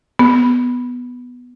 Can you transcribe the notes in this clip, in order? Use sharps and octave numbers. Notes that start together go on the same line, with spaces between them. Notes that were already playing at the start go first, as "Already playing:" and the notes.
B3